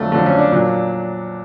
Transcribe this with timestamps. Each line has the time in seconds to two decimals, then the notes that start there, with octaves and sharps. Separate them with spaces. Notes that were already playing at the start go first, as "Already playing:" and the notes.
Already playing: F2 D3 F#3 A3
0.12 F2 D3 F#3 A3
0.26 C#4
0.38 D4
0.52 A#2 F#3